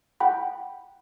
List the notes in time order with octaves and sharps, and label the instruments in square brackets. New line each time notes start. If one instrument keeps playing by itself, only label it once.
[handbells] F#5 G5 B5